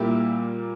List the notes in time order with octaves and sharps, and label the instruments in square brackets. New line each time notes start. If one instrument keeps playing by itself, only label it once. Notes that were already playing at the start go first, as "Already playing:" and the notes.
Already playing: [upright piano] A#2 G3 A#3 E4 G4